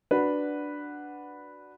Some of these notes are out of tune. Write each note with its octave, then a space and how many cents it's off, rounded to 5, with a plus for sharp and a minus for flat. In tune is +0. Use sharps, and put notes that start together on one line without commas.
D4 +0 F#4 +0 B4 +0